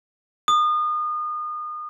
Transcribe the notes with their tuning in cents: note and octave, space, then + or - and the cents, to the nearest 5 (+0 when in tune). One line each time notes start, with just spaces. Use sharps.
D#6 -30